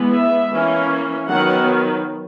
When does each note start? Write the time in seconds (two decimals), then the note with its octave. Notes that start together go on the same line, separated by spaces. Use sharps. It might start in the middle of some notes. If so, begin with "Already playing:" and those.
Already playing: E3 G#3 B3
0.12 E5
0.52 E3 A#3 C#4
1.29 D#3 F#3 B3 F#5